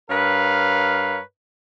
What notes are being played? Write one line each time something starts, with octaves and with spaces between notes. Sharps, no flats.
G2 A#4 B4 C#5 F5